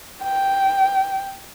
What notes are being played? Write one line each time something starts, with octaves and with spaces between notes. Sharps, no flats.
G5